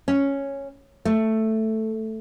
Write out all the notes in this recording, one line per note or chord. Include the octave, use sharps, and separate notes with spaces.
C#4
A3